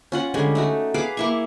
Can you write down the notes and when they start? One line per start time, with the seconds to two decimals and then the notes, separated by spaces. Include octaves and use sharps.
0.12 C#4 F4 F#5
0.34 D3 G3 G#3 C#4
0.55 A3 D#4 F#4
0.94 G#4 B4 F5 D6
1.17 A#3 E4 C#6